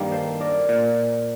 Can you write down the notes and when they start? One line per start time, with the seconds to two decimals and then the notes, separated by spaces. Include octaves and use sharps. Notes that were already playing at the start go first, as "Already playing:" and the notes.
Already playing: G2 D#3 G3 A#3
0.11 A4 C5
0.40 A#4 D5
0.69 A#2